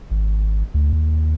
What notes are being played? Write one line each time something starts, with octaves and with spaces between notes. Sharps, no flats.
G#1
D2
D#2